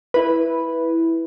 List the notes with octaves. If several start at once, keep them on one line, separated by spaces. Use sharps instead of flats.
E4 B4